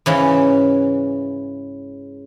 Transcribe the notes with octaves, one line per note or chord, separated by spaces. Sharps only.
G#2 C#3 E3